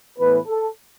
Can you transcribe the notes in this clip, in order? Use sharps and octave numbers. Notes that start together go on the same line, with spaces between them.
A2 E3 B3 B4
A4